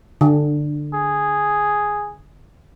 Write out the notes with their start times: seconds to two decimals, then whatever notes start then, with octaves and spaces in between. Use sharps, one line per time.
0.21 D3
0.94 G#4